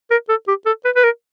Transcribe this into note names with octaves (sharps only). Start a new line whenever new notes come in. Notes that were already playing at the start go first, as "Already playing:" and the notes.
A#4
A4
G4
A4
B4
B4
A#4